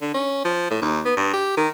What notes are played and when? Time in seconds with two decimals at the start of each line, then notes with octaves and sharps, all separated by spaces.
0.02 D3
0.14 C#4
0.45 F3
0.70 A2
0.82 D#2
1.05 B3
1.17 G2
1.33 G4
1.57 D#3